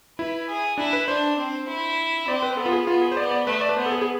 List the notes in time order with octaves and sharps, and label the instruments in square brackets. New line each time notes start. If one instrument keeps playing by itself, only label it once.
[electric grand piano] E4 [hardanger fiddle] B4
[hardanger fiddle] G#4
[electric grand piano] D4 [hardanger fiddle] E4
[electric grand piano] B4
[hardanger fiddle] D4 [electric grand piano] C5
[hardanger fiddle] C4
E4
[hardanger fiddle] C4 [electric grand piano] D5
[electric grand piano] B4
[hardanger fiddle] B3 [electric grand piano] A4
[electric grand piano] F4
G#4
[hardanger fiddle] B3 [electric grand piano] F4
[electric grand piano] G#4
C5
[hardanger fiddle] B3 [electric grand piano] D5
[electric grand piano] D5
[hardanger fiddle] A3 [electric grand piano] B4
[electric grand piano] D5
B4
[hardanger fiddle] B3 [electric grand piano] C5
[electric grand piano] A4
G#4
G#4